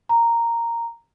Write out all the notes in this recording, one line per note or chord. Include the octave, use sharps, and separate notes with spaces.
A#5